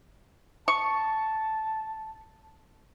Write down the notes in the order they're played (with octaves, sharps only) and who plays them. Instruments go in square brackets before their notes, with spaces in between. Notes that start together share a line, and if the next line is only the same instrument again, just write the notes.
[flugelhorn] A5 [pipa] C#6